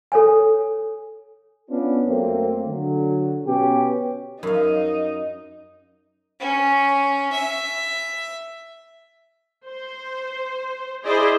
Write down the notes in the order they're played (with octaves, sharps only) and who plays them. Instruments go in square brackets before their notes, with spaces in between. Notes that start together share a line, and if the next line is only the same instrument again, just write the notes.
[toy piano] A4 C#5 G#5
[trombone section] B3 C#4 D4 F4
F#2 A3 A#3 C4
D3 F#3
B2 B3 C#4 G4
[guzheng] F#2 F5 [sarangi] D#4
[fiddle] C#4
E5
[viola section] C5
E4 G#4 C5 D5 D#5